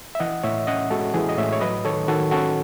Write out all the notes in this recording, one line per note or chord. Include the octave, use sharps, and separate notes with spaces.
E5
E3 D#5 F#5
A2 C#5 E5
C#4 D#5 F#5
G#3 F#4 A4
E3 G#4
D#5
A2 C#5 E5
C#5
F#3 B4 D#5
D#3 A4 C#5
D#3 F#4 A4
C#4 F#4 A4